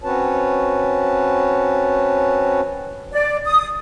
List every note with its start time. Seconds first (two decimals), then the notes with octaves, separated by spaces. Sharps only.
0.04 C4 C#4 F#4 B4 C#5 A5
3.13 D5
3.45 D#6